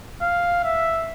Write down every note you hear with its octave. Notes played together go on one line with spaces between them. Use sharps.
F5
E5